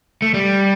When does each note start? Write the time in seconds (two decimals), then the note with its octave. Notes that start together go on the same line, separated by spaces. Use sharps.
0.22 A3
0.34 G3